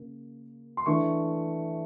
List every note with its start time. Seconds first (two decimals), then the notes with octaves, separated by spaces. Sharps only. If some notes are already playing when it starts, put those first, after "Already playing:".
Already playing: C#3 A#3
0.77 C6
0.86 E3 A3 D4 C#6